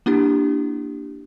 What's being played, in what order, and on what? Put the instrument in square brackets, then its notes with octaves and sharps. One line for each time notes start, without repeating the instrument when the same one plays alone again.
[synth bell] A#3 D4 E4 G4